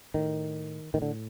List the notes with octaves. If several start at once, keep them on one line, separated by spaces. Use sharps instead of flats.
A2 D#3
A2 D#3
D3